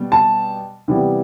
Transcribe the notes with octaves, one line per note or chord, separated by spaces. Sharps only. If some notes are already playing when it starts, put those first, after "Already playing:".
Already playing: B2 G3 B3
A5
C3 E3 G3 B3